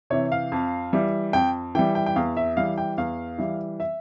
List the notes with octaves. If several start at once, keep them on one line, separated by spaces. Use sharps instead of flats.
C3 E3 C#5
F5
F2
E3 G3
F2 G5
E3 G3 G5
G5
G5
E2 F5
E5
E3 G3 F5
G5
E2 F5
E3 G3
E5